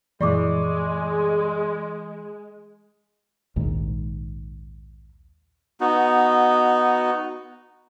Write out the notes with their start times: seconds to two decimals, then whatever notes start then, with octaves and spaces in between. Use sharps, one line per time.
0.21 F#2 A#2 E3 F3 G#3 D5 C#6 D6
3.56 A#1 D#2 G#2
5.80 B3 D#4 F#4